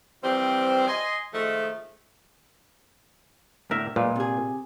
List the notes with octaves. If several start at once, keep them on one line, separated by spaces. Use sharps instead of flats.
E3 F3 G3 C4
D#5 G#5 C6
D#3 F3 G#3 A3
A2 D3 A#4 E5
B1 A#2 G#3 B4
C3 G#4